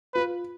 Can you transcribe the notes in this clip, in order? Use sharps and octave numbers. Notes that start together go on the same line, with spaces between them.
F4 B4